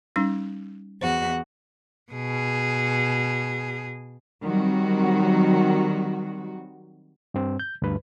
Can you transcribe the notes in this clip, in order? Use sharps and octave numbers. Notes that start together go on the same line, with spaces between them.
G3 C#4 D#4
E2 F#4 C5
B2 G#4
D#3 F#3 G3 C4 F#4
G2 C4
G6
D2 G2 B4